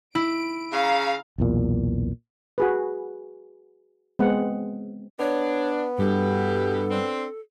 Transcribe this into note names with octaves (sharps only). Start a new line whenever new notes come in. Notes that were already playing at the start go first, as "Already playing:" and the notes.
E4 D7
C#3 F5 A#5
B1 E2 A#2
F#4 G#4 B4
G#3 B3 C4 F#5
B3 D4 C#5
G2 B2 E3 G4 A4
C4 D4